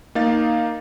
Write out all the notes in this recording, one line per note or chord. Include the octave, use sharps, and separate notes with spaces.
A#3 D#4 F5 A6